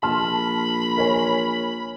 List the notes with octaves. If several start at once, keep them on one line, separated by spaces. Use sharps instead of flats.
A#1 A5 B5 C6 F6
A#4 C#5 G#5